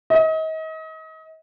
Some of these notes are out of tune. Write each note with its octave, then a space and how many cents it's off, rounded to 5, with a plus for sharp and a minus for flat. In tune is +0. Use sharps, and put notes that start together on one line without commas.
D#5 +35